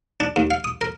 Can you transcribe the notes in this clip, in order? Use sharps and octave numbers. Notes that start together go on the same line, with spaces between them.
D4
D#2
F5
D#6
A#4